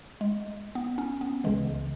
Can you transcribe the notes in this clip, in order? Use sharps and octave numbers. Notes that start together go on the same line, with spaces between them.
G#3
B3
C#4
B3
C#2 C#3 E3 G#3